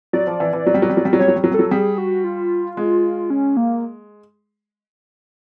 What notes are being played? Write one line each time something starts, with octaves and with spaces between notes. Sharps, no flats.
F#3 D5
F3
E3
E3
F#3
G3
F#3
G3
F#3
G3
F#3
G3 C#5
F#3
G3
F#3
G3
F#3 A4
G3 G#4
F#4
F4
G#3
C#4
A#3